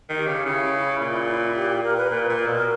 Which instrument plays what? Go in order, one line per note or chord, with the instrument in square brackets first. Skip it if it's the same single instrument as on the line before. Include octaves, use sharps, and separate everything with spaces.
[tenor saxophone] D#3
[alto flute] G4
[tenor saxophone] C#3
[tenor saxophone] C#3 [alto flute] E4
[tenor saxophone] A#2
[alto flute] G4
G4
A#4
B4
[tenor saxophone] A#2 [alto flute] A#4
[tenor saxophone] A#2
B2